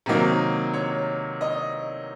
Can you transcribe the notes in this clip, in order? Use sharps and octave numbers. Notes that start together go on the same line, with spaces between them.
C3 D#3 F#3 A#3 D#4
C#5
D#5